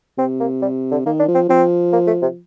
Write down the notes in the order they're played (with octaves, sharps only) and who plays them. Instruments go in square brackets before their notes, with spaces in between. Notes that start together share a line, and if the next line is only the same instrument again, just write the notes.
[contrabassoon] C3 [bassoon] C4
[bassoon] A#3
G3
D3
[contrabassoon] D#3 [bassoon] A#3
[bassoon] D4
[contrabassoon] F3
[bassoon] C4
[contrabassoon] F3 [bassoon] C4
[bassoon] A#3
A3
C3